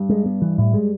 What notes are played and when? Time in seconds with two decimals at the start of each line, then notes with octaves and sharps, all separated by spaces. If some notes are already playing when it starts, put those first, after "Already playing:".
Already playing: G2
0.09 G#3
0.26 B3
0.42 E3
0.58 A2
0.74 G#3